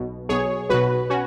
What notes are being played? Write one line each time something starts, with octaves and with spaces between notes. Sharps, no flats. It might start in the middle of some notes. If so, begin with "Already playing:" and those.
Already playing: B1 B2
B1 B2 G#4 C#5
B1 B2 F#4 B4
C#4 F#4